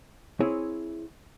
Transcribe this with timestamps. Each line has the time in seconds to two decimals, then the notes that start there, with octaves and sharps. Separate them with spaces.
0.40 C4 E4 G#4 C#5 G#5